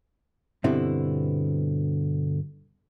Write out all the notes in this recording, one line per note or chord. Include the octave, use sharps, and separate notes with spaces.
G2 B2 D3 C4 E4